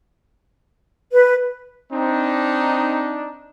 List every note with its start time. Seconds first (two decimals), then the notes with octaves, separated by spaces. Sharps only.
1.11 B4
1.92 C4 D4 D#4